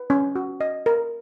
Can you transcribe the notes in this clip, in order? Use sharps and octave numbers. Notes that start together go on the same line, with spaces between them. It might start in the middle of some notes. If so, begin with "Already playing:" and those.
Already playing: B4
C#4
F#4
D#5
A#4